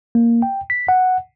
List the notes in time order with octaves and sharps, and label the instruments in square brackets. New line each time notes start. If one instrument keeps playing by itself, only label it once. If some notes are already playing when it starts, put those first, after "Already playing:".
[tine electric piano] A#3
G5
B6
F#5